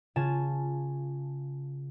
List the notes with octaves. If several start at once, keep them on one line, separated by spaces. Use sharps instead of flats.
C#3 F4 G#5 A5 E7